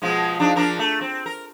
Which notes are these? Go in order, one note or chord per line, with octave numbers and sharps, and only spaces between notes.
B2 F3 G#3
F3 D4 D#4
F3 D4 A#4
A3
C4
A#4